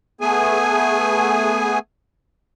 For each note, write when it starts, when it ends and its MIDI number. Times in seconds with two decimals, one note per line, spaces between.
0.21 1.79 57
0.21 1.79 59
0.21 1.79 68
0.21 1.79 80